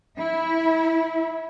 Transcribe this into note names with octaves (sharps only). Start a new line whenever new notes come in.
E4